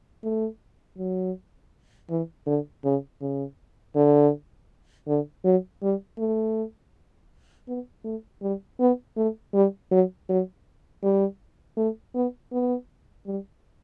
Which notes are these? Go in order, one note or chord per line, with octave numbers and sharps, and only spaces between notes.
A3
F#3
E3
D3
C#3
C#3
D3
D3
F#3
G3
A3
B3
A3
G3
B3
A3
G3
F#3
F#3
G3
A3
B3
B3
G3